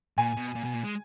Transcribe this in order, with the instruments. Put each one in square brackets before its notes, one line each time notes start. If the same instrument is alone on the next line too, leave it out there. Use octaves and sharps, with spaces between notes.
[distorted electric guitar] A#2 [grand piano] G#5
[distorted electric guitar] B2
A#2
B2
A#2
G#3